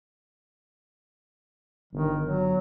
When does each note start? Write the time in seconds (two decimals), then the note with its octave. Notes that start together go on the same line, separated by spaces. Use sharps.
1.93 G1 D#3
2.23 F#3